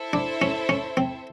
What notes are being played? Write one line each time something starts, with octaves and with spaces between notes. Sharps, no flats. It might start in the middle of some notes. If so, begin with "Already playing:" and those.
Already playing: E4 A4 C5 E5
D4
C#4
C#4
C4